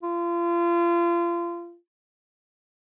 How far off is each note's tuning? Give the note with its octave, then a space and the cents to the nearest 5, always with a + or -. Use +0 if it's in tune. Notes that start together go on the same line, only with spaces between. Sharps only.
F4 -30